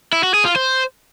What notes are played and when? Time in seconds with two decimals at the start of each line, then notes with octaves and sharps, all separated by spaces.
0.13 E4
0.23 F#4
0.34 G#4
0.45 F4
0.56 C5